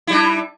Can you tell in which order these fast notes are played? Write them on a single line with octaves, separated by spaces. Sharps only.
E4 G3 D4